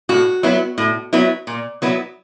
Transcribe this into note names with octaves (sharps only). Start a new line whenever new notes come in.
A2 F#4
F#3 B3 E4
A2
F#3 B3 E4
A#2
F#3 B3 E4